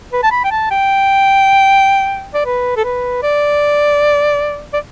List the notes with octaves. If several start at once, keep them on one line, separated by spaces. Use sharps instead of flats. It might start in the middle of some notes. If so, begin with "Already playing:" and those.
B4
A5
B5
G5
A5
G5
D5
B4
A4
B4
D5
D5